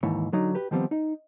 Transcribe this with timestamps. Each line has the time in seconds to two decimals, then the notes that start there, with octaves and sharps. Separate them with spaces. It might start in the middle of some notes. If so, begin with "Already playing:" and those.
0.03 D#2 G#2 D#3 E3 C#5
0.33 D3 F#3 D#4
0.55 G4 B4
0.71 D#3 F3 G3 B3 C4
0.91 D#4